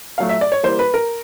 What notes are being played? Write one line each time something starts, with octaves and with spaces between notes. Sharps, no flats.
A#2 F#3 A3 F5
E5
D5
C#5
E3 G3 A#3 C5
B4
A#4